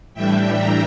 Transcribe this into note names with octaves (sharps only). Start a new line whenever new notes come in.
A2 E3 G3 D4 E5 G5
G5 A#5